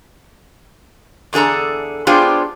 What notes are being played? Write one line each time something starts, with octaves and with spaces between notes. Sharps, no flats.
E2 D3 G#4 A4 A#5
B3 D4 F4 G4 G#4 C5